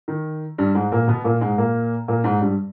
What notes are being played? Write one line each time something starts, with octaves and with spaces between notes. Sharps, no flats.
D#3
G2 G3
G#2 G#3
A#2 A#3
B2 B3
A#2 A#3
G#2 G#3
A#2 A#3
A#2 A#3
G#2 G#3
G2 G3